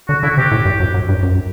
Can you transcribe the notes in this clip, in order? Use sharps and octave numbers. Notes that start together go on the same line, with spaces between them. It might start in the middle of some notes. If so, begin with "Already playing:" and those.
D3 F#4
D3 E4
F#4
C3 G4
A2
G2
F#2
F#2
G2
F#2